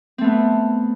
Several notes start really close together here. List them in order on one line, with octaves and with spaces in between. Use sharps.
C4 A3 B3